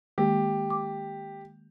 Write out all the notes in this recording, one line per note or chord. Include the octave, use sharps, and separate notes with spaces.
D#3 G#3 A#3 G4
D6